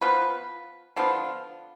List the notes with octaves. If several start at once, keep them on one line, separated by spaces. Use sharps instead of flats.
F3 B3 F4 B4
D3 F3 B3 F4